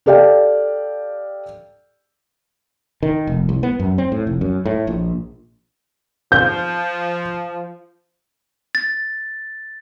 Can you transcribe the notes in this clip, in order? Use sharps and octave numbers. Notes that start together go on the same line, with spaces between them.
G4 A4 D5 F5 G5
D#3
F1
C2
B3
F#2
C4
A2
F1
F#2
A2
A#1
F3 G6
A6